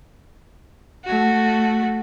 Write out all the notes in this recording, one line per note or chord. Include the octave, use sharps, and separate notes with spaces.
A3 F#4